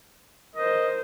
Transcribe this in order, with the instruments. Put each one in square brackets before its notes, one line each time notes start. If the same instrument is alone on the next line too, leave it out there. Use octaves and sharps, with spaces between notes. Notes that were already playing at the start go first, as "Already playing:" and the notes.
[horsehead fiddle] A#4 C5 [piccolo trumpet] D#5